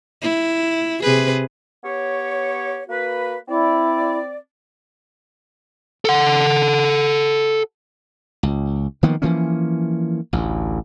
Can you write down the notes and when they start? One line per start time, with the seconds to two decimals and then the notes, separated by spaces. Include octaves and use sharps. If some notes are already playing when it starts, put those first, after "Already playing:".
0.22 E4
1.02 C3 G#4 B4
1.84 B3 G4 C#5
2.89 A#3 F#4 B4
3.48 C4 E4 D5
6.05 A4 F#5
8.43 C#2
9.03 D#3 F3 A#3 B3
9.22 E3 F3 A#3 C#4
10.33 A1 D2